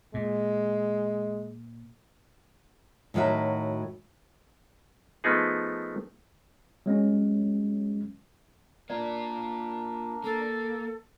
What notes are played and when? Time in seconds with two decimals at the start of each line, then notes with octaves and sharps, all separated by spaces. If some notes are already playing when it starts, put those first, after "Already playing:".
0.14 A#2 G#3
3.14 A2 D#3 F#3 F#4 E5
5.24 F3 A3 B3 D#4 G#4
6.86 F#3 G#3 C#4
8.90 A#3 D4 F4 A#4 D5
10.24 A#3 A4